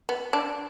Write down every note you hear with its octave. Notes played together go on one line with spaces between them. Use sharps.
B3
D4